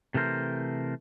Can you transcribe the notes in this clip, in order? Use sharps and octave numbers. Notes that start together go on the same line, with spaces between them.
C3 E3 A3 A#4 C5